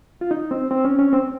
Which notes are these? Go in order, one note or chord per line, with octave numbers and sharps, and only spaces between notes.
F4
D#4
C4
C4
C#4
C#4
C4